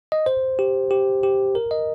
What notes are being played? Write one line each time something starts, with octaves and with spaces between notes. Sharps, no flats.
D#5
C5
G4
G4
G4
A#4
D#5